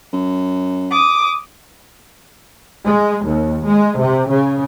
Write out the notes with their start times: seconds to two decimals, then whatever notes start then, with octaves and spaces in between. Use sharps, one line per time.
0.13 F#2
0.92 D6 D#6
2.85 G#3
3.24 D#2
3.66 G#3
3.99 C3
4.30 C#3